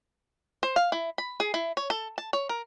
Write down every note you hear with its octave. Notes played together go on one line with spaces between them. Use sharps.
C5
F5
E4
B5
G#4
E4
C#5
A4
A5
C#5
A#4